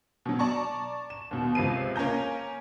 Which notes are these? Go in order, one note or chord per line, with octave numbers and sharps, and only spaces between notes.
B2 F#3
D5 A5 A#5 C#6
E7
D#2 B2
C#2 C3 B4 C7 D#7
A#3 C#4 G#5 A#5 G6